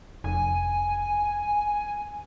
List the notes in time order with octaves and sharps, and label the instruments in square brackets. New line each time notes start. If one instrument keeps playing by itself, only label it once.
[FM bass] F1 [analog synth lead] G#5